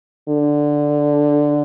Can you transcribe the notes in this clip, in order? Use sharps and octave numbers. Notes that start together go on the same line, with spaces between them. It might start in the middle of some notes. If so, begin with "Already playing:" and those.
D3